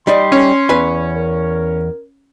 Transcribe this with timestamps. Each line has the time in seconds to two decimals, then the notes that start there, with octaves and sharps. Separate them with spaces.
0.07 G3 D#4 D5 C6
0.32 C#4
0.69 E2 B4 G#5
1.14 A#4